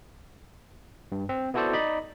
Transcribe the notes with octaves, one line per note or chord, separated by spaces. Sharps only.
G2
C4
B3 E4 F#4 A4 C5 D5
D#4 D5 D#5 B5